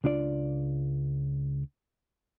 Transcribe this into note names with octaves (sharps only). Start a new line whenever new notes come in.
C#2 D4 F4 D5